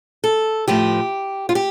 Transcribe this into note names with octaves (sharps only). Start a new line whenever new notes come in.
A4
A2 F3 G4
F4
G4